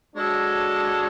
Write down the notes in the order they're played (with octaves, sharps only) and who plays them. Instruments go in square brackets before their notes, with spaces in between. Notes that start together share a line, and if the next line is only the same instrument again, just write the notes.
[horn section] G#3 D4 F#4 A4 C#5